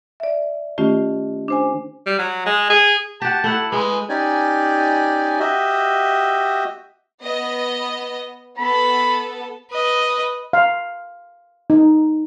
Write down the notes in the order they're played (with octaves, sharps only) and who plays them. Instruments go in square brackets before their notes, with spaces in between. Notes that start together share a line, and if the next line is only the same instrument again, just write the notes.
[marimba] D5 E5
D#3 A3 C#4 F4 G4
D4 C5 G#5
[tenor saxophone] G3
F#3
G#3
G#4
[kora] F#4 G4 [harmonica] A5
[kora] A3 E4 F#5
[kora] G#3 [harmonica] G#4 B4
[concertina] C#4 D#4 G4 D5 G#5
F#4 G4 D#5 E5
[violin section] B3 D#5
[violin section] B3 A4 [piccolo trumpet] B5
[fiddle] B4 D#5
[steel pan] F5
D#4